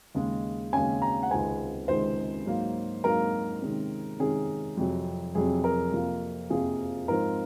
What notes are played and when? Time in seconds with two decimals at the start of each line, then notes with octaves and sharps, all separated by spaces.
0.15 D#2 C#3 G#3 C#4
0.73 D#2 C#3 G#3 C#4 G#5
1.02 A#5
1.23 F#5
1.30 C#2 C3 D#3 G#3 C4 G#5
1.88 C#2 C3 D#3 G#3 C4 C5
2.46 G#2 F#3 A#3
3.04 G#2 F#3 A#3 A#4
3.61 C3 D#3 G#3 C#4
4.19 C3 D#3 G#3 C#4 G#4
4.77 F2 C3 F#3
5.35 F2 C3 F#3 G#4
5.64 A#4
5.92 F2 C3 F3 A#3
6.50 F2 C3 F3 A#3 G#4
7.08 G#2 F3 C4 A#4